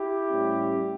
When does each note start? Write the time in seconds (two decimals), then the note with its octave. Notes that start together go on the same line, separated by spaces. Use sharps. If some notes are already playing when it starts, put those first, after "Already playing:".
Already playing: E4 G4
0.30 A2 G3 C#4